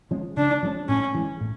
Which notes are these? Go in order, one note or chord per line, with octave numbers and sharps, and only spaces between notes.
F3 G#3 C#4
C#3 D4
F3 G#3 C#4
A2 C#4
E3 G#3
A2